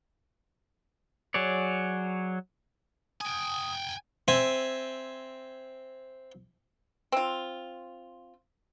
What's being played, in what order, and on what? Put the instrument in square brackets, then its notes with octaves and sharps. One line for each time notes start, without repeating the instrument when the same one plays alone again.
[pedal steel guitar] F#3 G#4 C#5 D5
[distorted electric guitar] G5 G#5 [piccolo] D#6
[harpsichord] C4 E5 G#5
[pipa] C4 F4